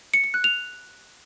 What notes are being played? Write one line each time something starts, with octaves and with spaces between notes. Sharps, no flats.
C#7
C#7
F#6
F7